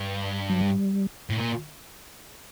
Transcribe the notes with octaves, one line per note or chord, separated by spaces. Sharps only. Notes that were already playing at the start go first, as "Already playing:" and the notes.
Already playing: G2
F#3
G3
A2
A#2